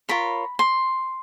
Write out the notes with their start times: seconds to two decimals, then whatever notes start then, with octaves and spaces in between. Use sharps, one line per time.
0.09 F4 A#4 C#5 B5
0.59 C6